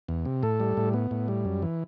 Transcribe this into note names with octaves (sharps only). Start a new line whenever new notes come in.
E2
C3
A2 A4
G3
A2
B3
A2
G3
F#2
E3